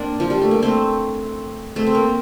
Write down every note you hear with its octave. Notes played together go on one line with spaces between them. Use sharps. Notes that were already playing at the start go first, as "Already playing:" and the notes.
Already playing: A#3 C4 D4
F3
G3
A3
A#3
A3 C4
A3 C4
C4
A#3